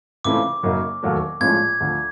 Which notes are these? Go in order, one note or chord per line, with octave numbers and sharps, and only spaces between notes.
C#2 C#3 E3 A3 C4 D6
F#2 C#3 F#3 A#3 D#4
E1 D#2 D#3 F#3 A3
A#1 A2 F3 G#3 C#4 G#6
D2 D3 F3